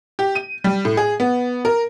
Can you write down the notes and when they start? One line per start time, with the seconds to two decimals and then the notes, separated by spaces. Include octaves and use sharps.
0.19 G4
0.35 D#7
0.64 G3
0.85 A2
0.97 G#4
1.20 B3
1.65 A#4